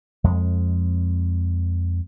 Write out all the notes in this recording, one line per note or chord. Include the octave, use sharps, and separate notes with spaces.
F2 G#3